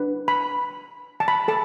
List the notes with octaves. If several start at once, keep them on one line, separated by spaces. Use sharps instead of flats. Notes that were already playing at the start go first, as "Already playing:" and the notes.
Already playing: D4 B4
B5
A5
B5
A4 A5